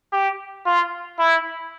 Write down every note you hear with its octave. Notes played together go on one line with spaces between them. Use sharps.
G4
F4
E4